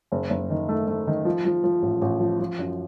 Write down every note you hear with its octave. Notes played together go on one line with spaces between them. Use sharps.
F#1
F#1
D#3
A3
A3
D#3
F3
F3
F3
A1
A1
F3
F3
F#2